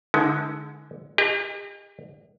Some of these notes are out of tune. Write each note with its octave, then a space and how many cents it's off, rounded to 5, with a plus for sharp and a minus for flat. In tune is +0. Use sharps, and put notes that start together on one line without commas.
D3 +5 G#3 +20 D#4 +45
G4 +45 D#5 -10